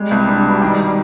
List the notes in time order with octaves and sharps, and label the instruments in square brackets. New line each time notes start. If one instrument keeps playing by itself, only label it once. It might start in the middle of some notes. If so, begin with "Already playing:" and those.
Already playing: [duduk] G3 [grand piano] G#3
[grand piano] C2
D4
B2
D#3